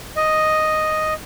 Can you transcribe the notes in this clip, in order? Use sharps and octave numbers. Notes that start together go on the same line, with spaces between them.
D#5